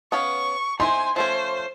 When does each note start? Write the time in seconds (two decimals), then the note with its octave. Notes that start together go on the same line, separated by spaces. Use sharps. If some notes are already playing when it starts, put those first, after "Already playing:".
0.12 B3 C#4 F5 C#6
0.80 D#4 E4 C5 G#5 C6
1.16 F3 A3 C#4 C5